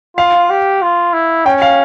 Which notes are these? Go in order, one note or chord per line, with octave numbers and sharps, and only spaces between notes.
F4 F5
G4
F4
E4
C#4 G5
F5